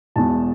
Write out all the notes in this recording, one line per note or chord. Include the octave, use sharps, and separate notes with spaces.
E1 E2 B2 A5